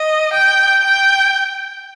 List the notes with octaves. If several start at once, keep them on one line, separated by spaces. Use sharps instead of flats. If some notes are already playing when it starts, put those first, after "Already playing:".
Already playing: D#5
G5
G5